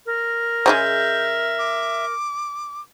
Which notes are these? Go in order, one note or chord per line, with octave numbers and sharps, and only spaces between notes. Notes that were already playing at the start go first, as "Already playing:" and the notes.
A#4
C#3 F3 G#3 E5 G6
D6